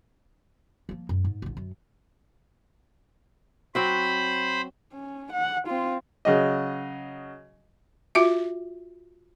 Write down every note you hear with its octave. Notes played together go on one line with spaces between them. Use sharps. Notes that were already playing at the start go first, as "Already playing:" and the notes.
F3 A#3
F#2
G#2
A1 D3
F#2
F#3 C4 F#4 C5 B5
C#4
F#5
C4 F4
C#3 F#3 D#5
F4 F#4 E5